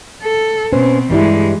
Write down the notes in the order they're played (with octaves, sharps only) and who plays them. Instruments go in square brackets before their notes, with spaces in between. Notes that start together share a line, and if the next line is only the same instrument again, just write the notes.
[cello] A4
[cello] B2 C4 [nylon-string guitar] C#4 B4 C5
[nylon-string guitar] G2 G3 E4 [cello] E3 G#3